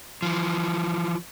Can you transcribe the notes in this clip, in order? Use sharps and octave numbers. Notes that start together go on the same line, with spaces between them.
E3 F3